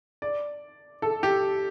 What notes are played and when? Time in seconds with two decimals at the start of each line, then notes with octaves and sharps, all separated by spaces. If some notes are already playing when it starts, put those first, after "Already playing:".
0.22 D5
1.02 A4
1.23 G4